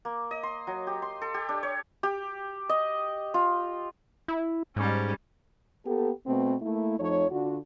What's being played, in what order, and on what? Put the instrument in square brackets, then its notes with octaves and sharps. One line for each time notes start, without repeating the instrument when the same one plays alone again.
[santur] A#3
D#5
C6
F#3
G4
C6
A4
G4
D4
C#5
G4
D#5
F4
[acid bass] E4
[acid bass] G#2 [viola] G3 C#4
[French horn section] A#3 B3 G4 A4
B2 A3 B3 C4
A3 A#3 E4
F2 F3 A3 D#4 C#5
D3 D4 F4 F#4